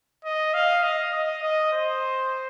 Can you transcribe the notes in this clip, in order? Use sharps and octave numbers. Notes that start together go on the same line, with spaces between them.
D#5
F5
D#5
D#5
D#5
C5